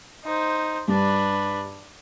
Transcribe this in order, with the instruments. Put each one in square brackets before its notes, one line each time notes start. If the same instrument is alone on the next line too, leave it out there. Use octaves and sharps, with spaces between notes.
[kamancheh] D#4 C5
[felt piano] G2 [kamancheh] D4 B4